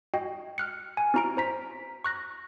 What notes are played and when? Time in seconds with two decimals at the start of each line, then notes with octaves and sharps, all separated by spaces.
0.14 F#4 D#5 G5
0.58 F6 F#6 C#7
0.97 G#5
1.14 C4 E4 F#4 A#5 F6 D7
1.37 C5 A#5 B6
2.04 C#6 F#6 A#6